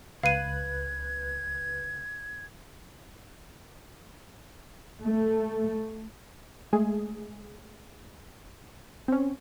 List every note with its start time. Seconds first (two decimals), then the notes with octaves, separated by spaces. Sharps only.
0.23 C#2 B4 F5 F#6 G#6 D#7
5.04 A3
6.73 G#3 A3 G#4
9.08 C4 C#4